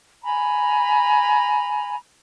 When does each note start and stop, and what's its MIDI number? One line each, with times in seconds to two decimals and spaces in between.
0.24 1.95 80
0.24 1.95 82
0.24 1.95 83